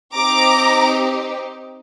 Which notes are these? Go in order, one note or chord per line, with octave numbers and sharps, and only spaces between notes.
C4 D#4 G4 A#5 D6